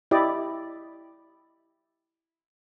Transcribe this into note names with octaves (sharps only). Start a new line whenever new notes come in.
E4 G4 D5 D#5